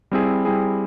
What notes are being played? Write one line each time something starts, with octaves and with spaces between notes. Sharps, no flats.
G3 C4 E4 G#4
G3 C4 E4 G#4